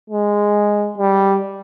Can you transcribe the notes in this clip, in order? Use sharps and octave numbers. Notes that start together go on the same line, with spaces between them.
G#3
G3